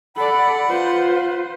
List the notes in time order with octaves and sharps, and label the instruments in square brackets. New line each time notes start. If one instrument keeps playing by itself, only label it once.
[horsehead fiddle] A4 D5 [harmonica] F#5 [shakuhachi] B5
[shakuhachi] F4 [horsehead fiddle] B4 C5